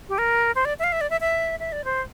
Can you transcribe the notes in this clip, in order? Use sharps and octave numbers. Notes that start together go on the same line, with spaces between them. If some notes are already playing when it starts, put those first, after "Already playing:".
G4
A#4
C5
D5
E5
F5
E5
D5
E5
E5
E5
D5
C5